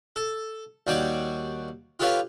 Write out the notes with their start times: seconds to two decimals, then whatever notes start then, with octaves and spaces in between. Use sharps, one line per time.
0.16 A4
0.87 D#2 G3 F#4 C#5 D6
2.00 F4 G4 A4 B4 C#5 F5